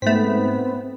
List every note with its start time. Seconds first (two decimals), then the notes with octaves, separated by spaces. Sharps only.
0.02 G#2 A3 B3 C4 B6